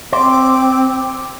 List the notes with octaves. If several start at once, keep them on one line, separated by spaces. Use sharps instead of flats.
C4 C5 D6